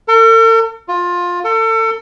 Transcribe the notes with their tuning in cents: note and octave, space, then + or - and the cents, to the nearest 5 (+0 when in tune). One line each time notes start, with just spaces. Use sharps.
A4 +45
F4 +15
A4 +30